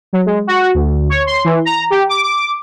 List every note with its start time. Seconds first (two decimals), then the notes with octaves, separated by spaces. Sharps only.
0.13 F#3
0.26 G#3
0.47 F#4
0.74 D2
1.09 C#5
1.26 C6
1.45 E3
1.65 A#5
1.90 G4
2.09 D6
2.23 D6